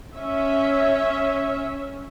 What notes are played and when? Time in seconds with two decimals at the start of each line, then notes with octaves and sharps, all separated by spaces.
0.15 C#4 E5